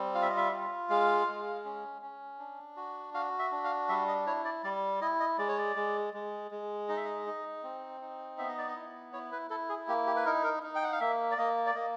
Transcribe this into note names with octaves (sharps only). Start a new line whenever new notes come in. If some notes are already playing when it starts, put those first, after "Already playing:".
Already playing: G3 C4
F4 F5
E5
D#5
E5
F4
G#3 F5
G#3
C#4
C#4
D4
F#4
F#4 F5
E5
D4
F5
G3 E5
D#5
E4 C#5
D5
G3 D5
E4 D#5
D#5
G#3 D5
C#5
D5
G#3
G#3
G#3
D#4 D#5
E5
D#5
D#4
C4
D#4
B3 E5
D#5
D5
D#5
E4
E4 C#5
B4
E4 A4
G#4
A#3 G4
G4
B4
D#4 A#4
A#4
D#4
G5
F#5
F5
A#3 E5
D5
A#3 D#5
D5
A#3 D#5